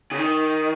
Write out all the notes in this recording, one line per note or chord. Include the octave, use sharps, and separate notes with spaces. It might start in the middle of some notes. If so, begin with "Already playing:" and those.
C#3
D#3